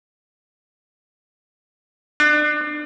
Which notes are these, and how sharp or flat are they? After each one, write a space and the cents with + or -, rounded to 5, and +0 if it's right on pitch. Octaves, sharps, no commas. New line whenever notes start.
D4 +30